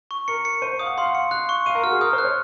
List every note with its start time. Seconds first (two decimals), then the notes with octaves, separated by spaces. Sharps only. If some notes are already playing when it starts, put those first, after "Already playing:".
0.11 C#6
0.28 A#4 C#7
0.45 C#7
0.62 C5 D#7
0.79 F5 D#6
0.86 F#5
0.98 F5 C6
1.05 F#5
1.15 F5 C#7
1.31 F5 F#6
1.49 C#6
1.66 F5 D#7
1.75 A#4
1.83 F#4 F6
1.92 G#4
2.01 A#4 D#6
2.13 C5
2.18 F#6
2.25 C#5